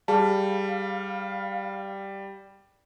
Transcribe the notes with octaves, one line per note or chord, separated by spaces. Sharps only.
G3 G#4 F5 A5